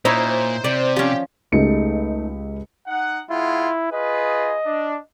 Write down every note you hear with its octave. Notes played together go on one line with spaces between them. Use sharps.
A#2 D#4 E4 C5 C#5
C3 D5
F3 C#4 G4
C#2 A3 D#4 G4 G#4 C#7
D#4 F#5
G#3 E4 F4 F#5
F4 G#4 B4 D#5
D4